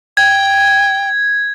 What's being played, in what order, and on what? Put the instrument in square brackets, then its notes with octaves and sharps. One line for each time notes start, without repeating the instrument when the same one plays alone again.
[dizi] G5 [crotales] G#6